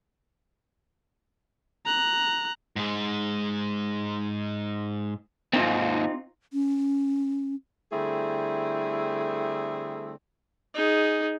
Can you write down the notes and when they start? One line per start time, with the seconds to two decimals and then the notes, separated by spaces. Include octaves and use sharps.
1.86 A#5 F#6
2.76 G#2 G#3
5.53 D#2 G#2 C4 D#4 F4
6.53 C#4
7.91 D3 G3 A3 C4 E4 G#4
10.74 D#4 G#4